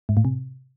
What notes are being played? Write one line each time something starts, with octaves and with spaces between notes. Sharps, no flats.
G#2
A2
C3